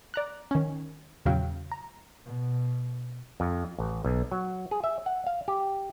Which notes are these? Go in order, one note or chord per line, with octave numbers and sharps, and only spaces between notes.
D5 A#5 F#6
D#3 C#4
E2 A#2 C#3 F#3 F5 G5
A#5
B2
F2
A1
B1
F#3
G#4
E5
F#5
F5
G4